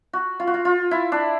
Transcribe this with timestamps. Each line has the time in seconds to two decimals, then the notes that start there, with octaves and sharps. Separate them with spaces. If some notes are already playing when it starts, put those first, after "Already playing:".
0.13 F#4
0.40 F4
0.47 F#4
0.54 F4
0.65 F4
0.91 E4
1.12 D4